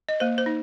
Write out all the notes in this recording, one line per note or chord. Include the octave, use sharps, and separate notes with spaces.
D#5
A#3 C5
C5
D#4